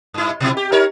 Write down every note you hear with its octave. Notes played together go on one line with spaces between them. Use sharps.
G2 E4
B2 F3 E4
G4
D#4 A#4 C#5